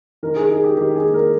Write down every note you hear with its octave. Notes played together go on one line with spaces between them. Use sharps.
D#3 A#4
G#4
D#4 G#4
G4
D#3 G4
G#4
A#3
A#4